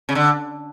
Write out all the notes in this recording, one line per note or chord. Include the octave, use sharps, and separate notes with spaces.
C#3
D3